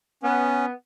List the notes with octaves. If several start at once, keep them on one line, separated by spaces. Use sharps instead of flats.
B3 C#4